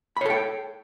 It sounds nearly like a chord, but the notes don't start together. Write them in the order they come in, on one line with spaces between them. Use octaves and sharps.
B5 C#5 A4 G5